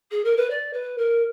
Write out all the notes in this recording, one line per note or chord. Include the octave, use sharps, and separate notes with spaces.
G#4
A#4
B4
D5
B4
A#4